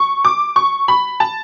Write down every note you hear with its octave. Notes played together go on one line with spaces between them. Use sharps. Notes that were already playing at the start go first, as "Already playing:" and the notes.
Already playing: C#6
D6
C#6
B5
A5